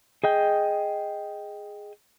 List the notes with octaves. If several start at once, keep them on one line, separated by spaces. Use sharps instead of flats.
G#4 D#5 G5